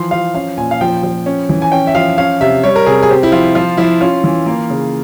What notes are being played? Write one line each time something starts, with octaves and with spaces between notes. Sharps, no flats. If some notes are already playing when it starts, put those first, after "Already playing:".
Already playing: E3 F3 C6
F3 F5
C#4 F5
A#2 G#5
F5
F3 G5
F3
C#4
E3
G#5
C#4 G5
E5
F3 F5
C#4 F5
C3 E5
G3 C#5
A#4
C3 G#4
G#4
C4 G4
E4
F3 F4
F3 F4
F3 E4
C#4 F4
E3
A#3
C#3